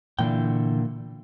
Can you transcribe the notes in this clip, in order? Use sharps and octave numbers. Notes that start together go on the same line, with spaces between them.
A#2 D3 E3 G5